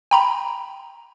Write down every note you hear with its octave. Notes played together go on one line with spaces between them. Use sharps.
G5 A#5 B5